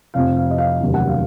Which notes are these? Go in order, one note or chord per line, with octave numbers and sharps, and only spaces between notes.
F1 F2 C3 F3 C4 F5
F5
D#5
F5
F1 D#2 C#3 F#3
F#5
F5